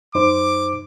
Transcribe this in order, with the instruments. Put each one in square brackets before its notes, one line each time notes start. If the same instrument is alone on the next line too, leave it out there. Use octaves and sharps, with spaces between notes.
[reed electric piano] F#2 D#4 C5 [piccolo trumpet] D6